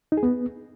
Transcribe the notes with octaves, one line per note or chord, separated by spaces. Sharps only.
D#4
G#4
B3